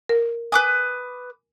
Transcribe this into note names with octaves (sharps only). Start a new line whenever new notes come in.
A#4
B4 G#5 D6 D#6